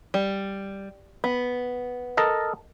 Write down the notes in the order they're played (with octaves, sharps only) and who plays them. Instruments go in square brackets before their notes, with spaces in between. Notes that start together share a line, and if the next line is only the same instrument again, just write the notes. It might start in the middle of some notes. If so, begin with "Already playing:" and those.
[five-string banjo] G3
B3
[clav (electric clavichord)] A4 A#4 D#5